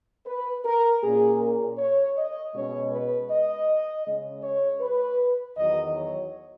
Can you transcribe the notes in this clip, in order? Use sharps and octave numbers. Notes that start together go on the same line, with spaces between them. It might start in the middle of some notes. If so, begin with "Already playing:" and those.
B4
A#4
A#2 A#3 C#4 G#4
A#4
C#5
D#5
B2 G#3 C#4 C#5
B4
D#5
C#3 G#3 C#4
C#5
B4
E2 D#3 F#3 D#5
C#5